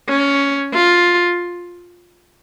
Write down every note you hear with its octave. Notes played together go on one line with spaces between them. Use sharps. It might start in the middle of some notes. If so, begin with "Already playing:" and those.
C#4
F4